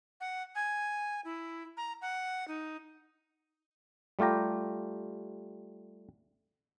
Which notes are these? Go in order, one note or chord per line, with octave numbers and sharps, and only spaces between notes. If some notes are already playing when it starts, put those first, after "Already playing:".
F#5
G#5
E4
A#5
F#5
D#4
G3 A3 F4 G4 A#5